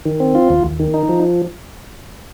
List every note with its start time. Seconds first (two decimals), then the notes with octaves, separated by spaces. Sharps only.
0.05 D#3
0.20 C4
0.35 F4
0.50 D#2
0.64 D#2
0.79 D#3
0.94 D#4
1.09 F3